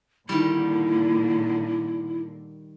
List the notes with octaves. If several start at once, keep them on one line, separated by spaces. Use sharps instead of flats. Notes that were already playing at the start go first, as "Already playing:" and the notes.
A#2 D3 D#3 G3 A#3 E4